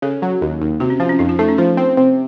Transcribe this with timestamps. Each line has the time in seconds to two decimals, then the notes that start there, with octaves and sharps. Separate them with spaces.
0.02 C#3 A4
0.22 F#3
0.41 D#2
0.61 D#2
0.80 C3 F#4
0.90 C#4
1.00 F3 C4
1.09 C#4
1.19 F2 D#4
1.29 F4
1.39 A3 D#4
1.48 C#4
1.58 F3 C5
1.77 C4
1.97 C3